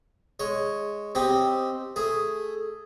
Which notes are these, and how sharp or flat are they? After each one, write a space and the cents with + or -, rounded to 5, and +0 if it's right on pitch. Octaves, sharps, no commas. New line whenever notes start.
G#3 +0 C#5 +0
C4 +0 D#4 +0 G4 +0
A3 +0 G#4 +0